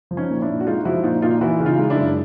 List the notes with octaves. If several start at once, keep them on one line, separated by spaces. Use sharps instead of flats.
F3
C#4 D#4
A#2
D4 E4
A#2
F#4
G#3 D#4 F4
F3 E4 F#4
A#2 D#4 F4
A#2 D#4 F4
E3 E4 F#4
C#3
D#4 F4
G#3
D4 E4
F#2